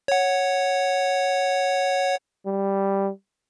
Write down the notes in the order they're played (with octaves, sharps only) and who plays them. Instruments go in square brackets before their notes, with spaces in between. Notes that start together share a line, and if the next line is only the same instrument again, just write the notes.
[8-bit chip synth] C#5 F#5
[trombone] G3